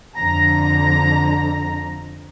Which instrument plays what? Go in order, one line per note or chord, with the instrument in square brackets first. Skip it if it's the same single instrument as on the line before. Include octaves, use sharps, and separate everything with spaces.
[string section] F2 D3 A#5